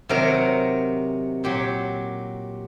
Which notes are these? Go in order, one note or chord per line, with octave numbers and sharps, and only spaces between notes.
C3 D#3 F#3 A#4
A#2 F#3 G4